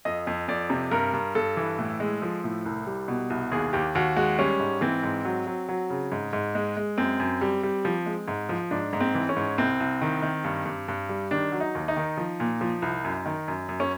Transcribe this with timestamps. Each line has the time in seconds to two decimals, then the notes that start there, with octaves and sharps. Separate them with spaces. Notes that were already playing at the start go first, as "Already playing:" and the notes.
0.05 F2 D#5
0.27 F2
0.48 F2 D5
0.70 C3
0.91 G2 A#4
1.13 G2
1.35 G2 A4
1.57 E3
1.79 A2
2.00 G#3
2.22 F3
2.44 A2
2.66 C2
2.87 G3
3.08 B2
3.30 C2
3.52 D#2 G#4
3.73 D#2 G4
3.95 D#2 F#4
4.16 G#3 F#4
4.39 G3 C#4
4.60 G#2
4.81 E3 C4
5.03 G#2
5.25 F#3
5.47 F#3
5.69 F#3
5.90 C#3
6.12 G#2
6.33 G#2
6.55 G#3
6.77 G#3
6.98 F#2 C4
7.20 F#2
7.41 G3
7.63 G3
7.85 F3
8.06 G#3
8.28 G#2
8.49 F3
8.71 G#2 D4
8.93 G#2
9.00 C4
9.15 E3
9.29 C#4
9.37 G#2
9.58 C2 C4
9.80 C2
10.02 D#3
10.22 D#3
10.44 G2
10.66 G2
10.88 G2
11.09 G3
11.31 D#3 D4
11.52 F#3
11.60 D#4
11.75 D#2
11.88 D#4
11.97 D#3
12.17 F3
12.40 A#2
12.61 F3
12.82 C2
13.04 F#2
13.25 D#3
13.48 F#2
13.69 F#2
13.80 C#4